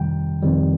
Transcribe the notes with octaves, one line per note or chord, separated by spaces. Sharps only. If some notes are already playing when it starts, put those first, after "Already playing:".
Already playing: F2 C3 D#3 G3 G5
F2 C3 D#3 G3